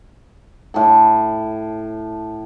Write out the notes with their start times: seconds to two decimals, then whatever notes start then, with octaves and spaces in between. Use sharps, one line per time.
0.74 A2 G5 A5